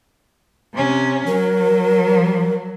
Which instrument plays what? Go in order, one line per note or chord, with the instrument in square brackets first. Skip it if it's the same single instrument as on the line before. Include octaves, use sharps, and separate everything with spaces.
[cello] C3 C#4
[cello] F#3 [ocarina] A#4